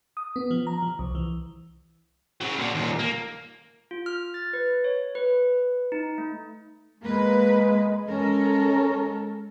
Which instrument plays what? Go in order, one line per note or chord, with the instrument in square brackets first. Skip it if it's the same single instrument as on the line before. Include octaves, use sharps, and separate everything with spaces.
[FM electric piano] D#6
B3
F3
A#5
F3
C2
E3
[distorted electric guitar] C#3 F#3
A#2 D3
D#2 A#2
A#3
[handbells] F4
F6
A6
B4
C#5
B4
D#4
A3
[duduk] G#3 [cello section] A#3 B4
[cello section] G#3 A4 A#4 [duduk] C#4